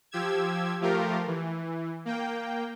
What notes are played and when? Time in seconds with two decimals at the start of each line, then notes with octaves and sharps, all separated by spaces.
0.11 F3 G4 E6 G#6
0.81 F3 A3 F4 G4 A#4
1.27 E3
2.05 A#3 G5